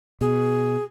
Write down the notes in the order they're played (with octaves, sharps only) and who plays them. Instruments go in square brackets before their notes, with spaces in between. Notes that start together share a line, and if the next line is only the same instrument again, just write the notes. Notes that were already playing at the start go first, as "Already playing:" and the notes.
[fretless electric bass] B2 [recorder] G#4